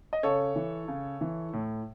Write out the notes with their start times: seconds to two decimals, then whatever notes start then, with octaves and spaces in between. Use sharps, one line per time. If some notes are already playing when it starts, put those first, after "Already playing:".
0.13 D#5
0.23 C#3 A4 C#5
0.56 E3
0.88 C#3
1.21 E3
1.53 A2